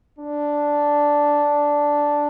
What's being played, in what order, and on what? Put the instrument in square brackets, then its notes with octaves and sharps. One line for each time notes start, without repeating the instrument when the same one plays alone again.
[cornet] D4